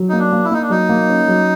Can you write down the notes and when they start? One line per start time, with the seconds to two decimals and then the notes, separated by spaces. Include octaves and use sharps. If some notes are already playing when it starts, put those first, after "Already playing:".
Already playing: F#3
0.09 A#3 D#4
0.19 D4
0.32 A#3
0.45 E4
0.51 A#3 D#4
0.62 D4
0.70 F#3 D#4
0.89 A#3
1.09 C#4
1.28 F#3